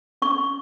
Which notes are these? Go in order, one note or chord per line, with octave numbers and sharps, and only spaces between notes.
C#4 C#6